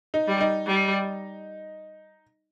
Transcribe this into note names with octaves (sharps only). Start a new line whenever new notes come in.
D#4
G3
D#4
G3